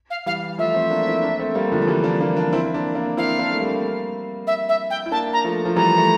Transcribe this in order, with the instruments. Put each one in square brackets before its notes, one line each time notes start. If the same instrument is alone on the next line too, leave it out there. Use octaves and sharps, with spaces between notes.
[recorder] F5
[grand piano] E3 G3 [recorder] F5
[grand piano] F3 A3 [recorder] E5
[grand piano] A3 C4
A#3 D4
C4 E4
A#3 D4
A3 C4
G3 A#3
D3 F3
F3
E3 G3
A#3 D4
A#3 D4
A#3 D4
C4 E4
A#3 D4
A#3 D4
[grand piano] C4 E4 [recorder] F5
[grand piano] A#3 D4
A3
G3 A#3
[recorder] E5
E5
G5
[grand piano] E4
[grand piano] A#3 D4 [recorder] A5
[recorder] A#5
[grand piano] F3 A3
F3
[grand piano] E3 G3 [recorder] A#5
[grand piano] A3